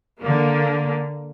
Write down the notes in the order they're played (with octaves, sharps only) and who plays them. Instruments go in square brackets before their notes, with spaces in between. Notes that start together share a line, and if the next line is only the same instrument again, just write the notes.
[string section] D3 A#3